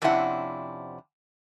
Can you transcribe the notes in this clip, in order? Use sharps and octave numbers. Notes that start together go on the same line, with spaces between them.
F2 C3 C#4 D4 E4 F#5